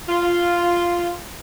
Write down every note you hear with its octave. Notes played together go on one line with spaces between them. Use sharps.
F4